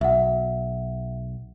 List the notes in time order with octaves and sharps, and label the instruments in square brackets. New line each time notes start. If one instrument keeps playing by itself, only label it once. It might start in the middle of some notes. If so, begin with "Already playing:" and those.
[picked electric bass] B1 [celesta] E5 F#5